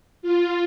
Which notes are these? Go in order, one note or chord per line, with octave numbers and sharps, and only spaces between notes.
F4